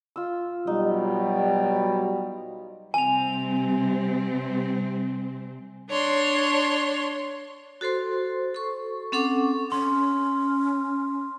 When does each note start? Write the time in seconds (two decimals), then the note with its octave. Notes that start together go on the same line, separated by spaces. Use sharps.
0.16 F4 E6
0.67 B2 F#3 G3 D#4
2.94 C3 G3 C4 G#5 F7
5.90 D4 C#5 C6
7.81 F#4 A4 C5 C6
8.54 A4 C#6
9.12 C4 C#4 A4 F#5 C#6 D6
9.72 C#4 C6